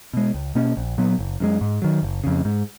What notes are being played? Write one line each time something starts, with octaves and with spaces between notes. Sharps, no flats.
B2 G#3
C#2
B2 A#3 C#4
A#1
A#2 F#3 B3
F#1
F#2 C#3 G#3
G#2
D#3 F#3
F#1
F2 C#3
G#2